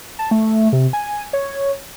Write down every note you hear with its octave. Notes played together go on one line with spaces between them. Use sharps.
A5
A3
C3
G#5
C#5